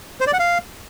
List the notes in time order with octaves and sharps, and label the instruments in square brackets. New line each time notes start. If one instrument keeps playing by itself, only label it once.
[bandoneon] C5
D5
F#5
F5